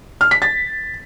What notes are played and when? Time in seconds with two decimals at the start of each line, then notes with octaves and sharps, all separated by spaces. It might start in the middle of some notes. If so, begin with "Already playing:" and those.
0.21 F6
0.31 B6
0.42 A6